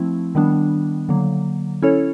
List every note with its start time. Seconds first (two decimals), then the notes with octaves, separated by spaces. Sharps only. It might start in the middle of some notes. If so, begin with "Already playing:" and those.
Already playing: F3 A3 C4 E4
0.35 D#3 G3 B3 D4
1.09 D3 F#3 A#3
1.82 C#4 E4 A4 C#5